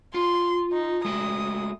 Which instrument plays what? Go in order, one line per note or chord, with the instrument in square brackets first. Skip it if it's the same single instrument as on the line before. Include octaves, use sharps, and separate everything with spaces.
[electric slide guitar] F4 [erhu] C6
[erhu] D#4
[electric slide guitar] G#3 A3 F#4 [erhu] D#6